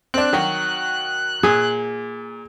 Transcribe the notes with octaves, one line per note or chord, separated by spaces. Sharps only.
C4 D4 F#6
D#3 F#3 F#4
A#2 G#4